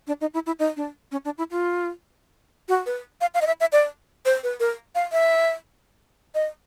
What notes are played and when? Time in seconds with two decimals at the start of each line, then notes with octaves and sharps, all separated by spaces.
0.07 D4
0.21 D#4
0.34 E4
0.46 E4
0.59 D#4
0.76 D4
1.11 C#4
1.25 D4
1.38 E4
1.51 F4
2.68 F#4
2.86 B4
3.21 F5
3.34 F5
3.41 D#5
3.47 E5
3.60 E5
3.72 D5
4.25 C5
4.43 B4
4.60 A#4
4.95 F5
5.12 E5
6.34 D#5